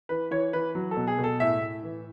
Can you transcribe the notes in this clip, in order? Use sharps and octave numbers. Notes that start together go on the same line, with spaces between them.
E3 B4
E3 C#5
E3 B4
F#3
A4
B2
G#4
B2
A4
A2 E5
A2
E3